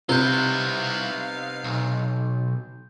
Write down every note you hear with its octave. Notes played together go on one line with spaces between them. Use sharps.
C3 G3 B3 D#4 E4 F5 G6 G7
B1